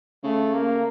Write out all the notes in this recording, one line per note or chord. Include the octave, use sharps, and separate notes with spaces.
C#3 A3
A#3